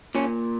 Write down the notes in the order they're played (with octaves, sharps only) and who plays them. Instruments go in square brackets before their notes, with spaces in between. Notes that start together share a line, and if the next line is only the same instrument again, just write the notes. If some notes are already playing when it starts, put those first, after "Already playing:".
[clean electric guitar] A#2 C#4